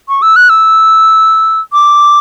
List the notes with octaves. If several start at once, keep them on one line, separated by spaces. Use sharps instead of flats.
C#6
E6
F#6
E6
D6